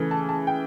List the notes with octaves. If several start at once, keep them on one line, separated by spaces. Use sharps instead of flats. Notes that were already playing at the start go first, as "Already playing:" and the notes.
Already playing: C#3 E3 A3
A5
A5
G5